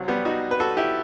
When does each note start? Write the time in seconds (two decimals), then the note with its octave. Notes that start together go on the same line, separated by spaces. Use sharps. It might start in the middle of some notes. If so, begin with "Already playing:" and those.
Already playing: C2 C3 F#3
0.08 G3 B3
0.25 D#4 F#4
0.51 B4
0.60 F#4 A4
0.77 E4 G4